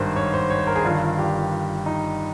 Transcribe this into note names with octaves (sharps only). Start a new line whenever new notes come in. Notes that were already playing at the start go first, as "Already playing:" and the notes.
Already playing: G#1 G2 D#3 C5
C#5
C5
C#5
C5
A#4
G#4
G1 G2 D#3 F4
G4
D#4